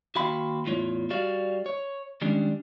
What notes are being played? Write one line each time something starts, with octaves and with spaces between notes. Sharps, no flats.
D#2 F#4 F5 G5 B5 C6
E2 A2 F4 C#5
G3 F#4 D5 F5
C#5
D#3 G3 G#3 C#4 D4